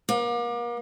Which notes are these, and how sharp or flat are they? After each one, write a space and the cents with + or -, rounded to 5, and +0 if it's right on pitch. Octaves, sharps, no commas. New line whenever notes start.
A#3 +40